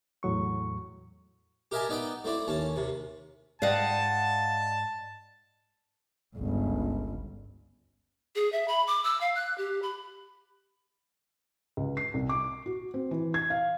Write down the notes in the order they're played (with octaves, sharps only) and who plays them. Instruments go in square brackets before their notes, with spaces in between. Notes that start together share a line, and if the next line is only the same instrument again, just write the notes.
[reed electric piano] E2 A2 F#3 C#6
[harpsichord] G4 A#4 D#5 E5 G#5 A5
B3 D#4 D5 F#5 G5
A3 C4 E4 D5
D#2 C#4 A5
D#2 C3
[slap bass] G#2 [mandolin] F4 F#5 [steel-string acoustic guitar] D5 D#5 G5 [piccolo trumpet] A5
[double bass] G1 C#2
[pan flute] G#4
E5
B5
D6
E6
F5
F#6
G4
B5
[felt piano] C#2
C7
C2
D6
F#4
C4
E3
G#6
F5